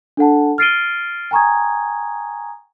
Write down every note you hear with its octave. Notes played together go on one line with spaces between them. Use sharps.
D4 A4 F#5 A5
F6 A6 C7 D7 D#7 G7
G5 G#5 A#5 C#6 D#6 G#6